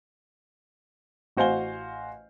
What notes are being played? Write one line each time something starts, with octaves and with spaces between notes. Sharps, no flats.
A1 F#4 C5 F5 G#5 G7